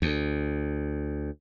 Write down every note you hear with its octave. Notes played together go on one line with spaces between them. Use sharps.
D2